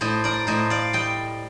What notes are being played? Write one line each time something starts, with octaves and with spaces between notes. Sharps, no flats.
A2 C5 D#5
A#4 D5
A2 C5 D#5
D5 F5
G3 D#5 G5